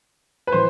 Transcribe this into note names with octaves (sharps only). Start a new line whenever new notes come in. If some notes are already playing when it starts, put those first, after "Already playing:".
B4
A2 E3 C5